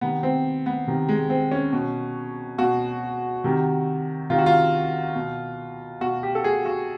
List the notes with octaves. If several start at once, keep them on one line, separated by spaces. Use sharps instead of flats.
C3 D#3 B3
C4
B3
C3 D#3
G#3
C4
C#4
B2
B2 F#4
C3 D#3
C3 D#3 F4
F#4
F4
B2
B2 F#4
G4
A4
G#4
F#4